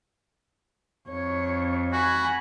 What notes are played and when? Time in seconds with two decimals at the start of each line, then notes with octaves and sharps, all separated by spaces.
1.09 F2 C#5
1.93 F#4 G#5 B5